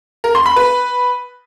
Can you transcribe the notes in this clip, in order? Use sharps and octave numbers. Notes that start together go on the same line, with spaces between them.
A#4
C6
B5
B4